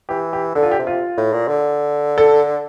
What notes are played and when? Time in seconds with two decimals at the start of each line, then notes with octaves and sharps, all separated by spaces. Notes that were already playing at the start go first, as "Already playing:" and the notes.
0.09 E3 G4
0.33 G4
0.55 D3 A4
0.63 F4
0.72 G4
0.79 C3
0.87 F4
1.17 A2
1.33 A#2
1.48 D3
2.18 A4